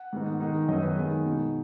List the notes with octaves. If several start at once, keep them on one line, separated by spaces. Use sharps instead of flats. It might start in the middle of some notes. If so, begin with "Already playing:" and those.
Already playing: F#5
G#2 D#3 B3 D#4
D#3 G#3 D#4
F#2 D#3 B3 D#4 D#5
B4
D#3 G#3 B3 D#4 G#4
B2 G#3 D#4